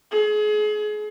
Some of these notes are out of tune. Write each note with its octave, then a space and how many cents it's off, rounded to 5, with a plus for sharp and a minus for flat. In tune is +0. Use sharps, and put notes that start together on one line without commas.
G#4 +30